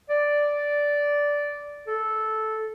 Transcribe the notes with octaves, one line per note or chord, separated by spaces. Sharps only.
D5
A4